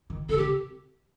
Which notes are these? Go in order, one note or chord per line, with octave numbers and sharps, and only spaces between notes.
D#3
D3 A4
C3 G4